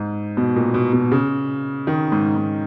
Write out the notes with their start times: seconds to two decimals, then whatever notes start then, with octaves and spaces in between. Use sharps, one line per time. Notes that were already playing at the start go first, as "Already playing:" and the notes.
Already playing: G#2
0.37 B2
0.56 A#2
0.74 B2
0.93 B2
1.12 C#3
1.87 D#3
2.12 G#2
2.36 G#2